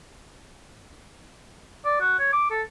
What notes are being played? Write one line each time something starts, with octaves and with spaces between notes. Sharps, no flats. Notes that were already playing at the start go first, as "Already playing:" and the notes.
D5
F#4
C#5
D6
A4